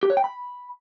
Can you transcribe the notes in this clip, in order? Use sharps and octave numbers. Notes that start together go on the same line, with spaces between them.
G4
C#5
G5
B5